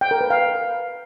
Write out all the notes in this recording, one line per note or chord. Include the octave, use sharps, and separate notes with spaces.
G5
A#4
B4
F5